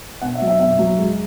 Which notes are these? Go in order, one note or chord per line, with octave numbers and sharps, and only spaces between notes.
B2 F#5
E5
F#3
E5
B2 E5
F#3
G#3